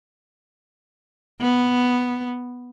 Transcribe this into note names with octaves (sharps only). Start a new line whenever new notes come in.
B3